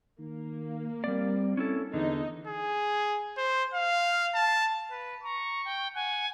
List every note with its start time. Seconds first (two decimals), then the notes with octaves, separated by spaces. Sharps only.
0.20 D#3 A#3
1.04 G3 C4 D5
1.57 C#4 E4 A4
1.94 E2 D3 D#4
2.47 G#4
3.37 C5
3.74 F5
4.35 A5
4.91 B4
5.23 A#5 C#6
5.65 G5
5.95 F#5 G#5